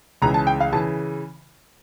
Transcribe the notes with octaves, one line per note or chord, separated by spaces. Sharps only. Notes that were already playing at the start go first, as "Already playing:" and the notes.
C#2 C#3 E3 A#5
A5
G5
F5
C#3 E3 A5